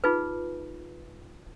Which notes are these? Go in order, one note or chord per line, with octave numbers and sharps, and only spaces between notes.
D#4 F4 G#4 B4